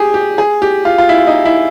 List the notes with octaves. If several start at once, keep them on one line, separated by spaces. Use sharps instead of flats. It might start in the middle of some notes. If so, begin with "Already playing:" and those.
Already playing: G4 G#4
G4
G#4
G4
F4
F4
E4
D#4
E4